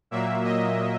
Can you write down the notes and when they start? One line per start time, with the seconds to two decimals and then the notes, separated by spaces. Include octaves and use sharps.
0.11 A#2 F#3 A#3 E5
0.44 D#5